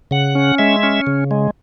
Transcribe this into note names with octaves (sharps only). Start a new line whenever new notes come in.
C#3 F#5
C#4
G#3 E5
C#4
C#3
G#3